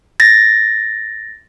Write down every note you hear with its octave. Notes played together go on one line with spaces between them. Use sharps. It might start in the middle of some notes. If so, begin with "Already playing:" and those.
A6 A#6